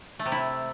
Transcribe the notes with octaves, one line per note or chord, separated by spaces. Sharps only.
A3
C3
E4